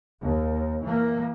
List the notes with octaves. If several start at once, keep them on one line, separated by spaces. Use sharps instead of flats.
D#2
E3 A#3